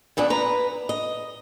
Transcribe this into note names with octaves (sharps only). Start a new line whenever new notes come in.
E2 A#2 B3 D4
B4 A#5
D#5